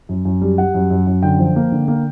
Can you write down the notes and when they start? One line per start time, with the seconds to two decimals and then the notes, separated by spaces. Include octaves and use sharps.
0.09 F#2
0.25 F#2
0.41 G3
0.58 G3 F#5
0.74 F#2
0.91 F#2
1.07 F#2
1.23 D3 G5
1.39 F3
1.56 A#3
1.72 D3
1.88 A#3